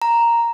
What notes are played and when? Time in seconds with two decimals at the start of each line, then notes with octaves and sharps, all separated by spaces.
0.02 A#5